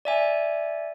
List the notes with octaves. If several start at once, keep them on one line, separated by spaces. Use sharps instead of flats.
D5 E5 G#5